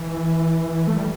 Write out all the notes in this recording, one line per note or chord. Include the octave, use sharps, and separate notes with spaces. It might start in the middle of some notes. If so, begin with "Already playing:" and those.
Already playing: E3
A3
G3